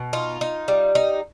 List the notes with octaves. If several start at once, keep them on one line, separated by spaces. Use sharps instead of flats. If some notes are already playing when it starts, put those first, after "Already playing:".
Already playing: B2
D#4 F4
D#4
G3
D#4